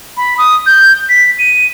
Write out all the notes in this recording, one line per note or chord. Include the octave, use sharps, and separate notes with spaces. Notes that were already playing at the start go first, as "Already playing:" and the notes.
B5
D#6
G6
B6
D#7